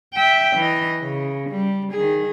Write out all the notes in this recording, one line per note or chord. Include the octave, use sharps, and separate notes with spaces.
E5 G5
E3 D#5
C#3
G3
D#3 G#4